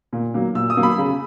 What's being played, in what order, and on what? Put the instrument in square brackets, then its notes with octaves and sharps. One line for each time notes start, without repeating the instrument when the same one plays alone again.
[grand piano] A#2
F#3 A#3
A#2 E6
D#6
F#3 A#3
B5
C#3